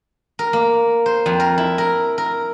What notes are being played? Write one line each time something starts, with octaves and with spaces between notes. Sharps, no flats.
A#4
A#3
C5
F2
A#4
E4
A#4
A#4